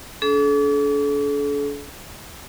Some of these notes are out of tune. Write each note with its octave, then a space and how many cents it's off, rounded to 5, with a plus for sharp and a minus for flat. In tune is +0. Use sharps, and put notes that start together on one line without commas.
D4 -40 A4 -40